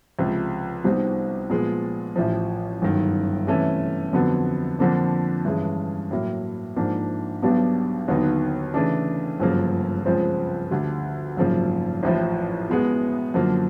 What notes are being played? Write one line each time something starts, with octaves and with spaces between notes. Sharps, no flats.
C#2 C3 F3
C2 B2 G3 C4 D#4
A#2 F3 G#3 B3
A1 A2 F3
G1 F#2 D#3
C3 E3 A3 C#4
F2 D3 F#3 B3
F2 D3 F3 A#3 D4
G2 E3 G#3 C#4
A2 F#3 A#3
G#2 F3 A#3 D4
B1 B2 G3 B3 D4
D#2 D3 F#3 B3 D#4
C#3 E3 A3 D4
G1 F#2 C#3 F3 A#3
C#2 C#3 F3 G#3 C4
D2 D3 G3
G#1 F#2 C#3 F3 A#3
A1 A2 F3
B2 G#3 B3
F#2 D3 F3 A#3